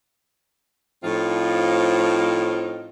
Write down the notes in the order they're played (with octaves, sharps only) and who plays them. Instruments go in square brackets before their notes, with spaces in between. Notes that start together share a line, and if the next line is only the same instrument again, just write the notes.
[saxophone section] A2 F3 C4 D#4 F4